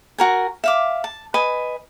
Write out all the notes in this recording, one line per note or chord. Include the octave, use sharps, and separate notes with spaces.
F#4 A#4 G#5
E5 F5 D6
A5
B4 D#5 G#5